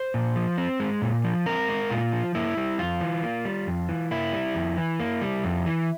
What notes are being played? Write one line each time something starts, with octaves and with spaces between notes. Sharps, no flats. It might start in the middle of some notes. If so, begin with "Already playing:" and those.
Already playing: C5
A#2
F3
C4
G#3
A#2
F3
C4 A#4
G#3
A#2 F4
F3
A#3 E4
G3
F2 F4
E3
A#3
G3
F2
E3
A#3 E4
G3
F2
E3
A#3
G3
F2
E3